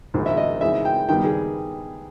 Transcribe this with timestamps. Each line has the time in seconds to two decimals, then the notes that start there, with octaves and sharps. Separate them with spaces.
0.14 A#1 G#2 D#3
0.26 E5
0.37 D#5
0.61 G#2 E3 G#3 E5
0.85 G5
1.08 G2 D#3 G3 B3 G5
1.25 G#4